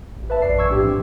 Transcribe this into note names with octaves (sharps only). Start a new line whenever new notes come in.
A1
B4 E5 A5
A#1 F#2 D5 C7
A#1 E3 C#6 E6 G#6
A2 F3 D4 G4
C4